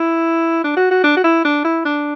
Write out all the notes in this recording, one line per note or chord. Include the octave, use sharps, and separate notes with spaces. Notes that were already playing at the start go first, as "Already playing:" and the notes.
Already playing: E4
D4
F#4
F#4
D4
F#4
E4
D4
E4
D4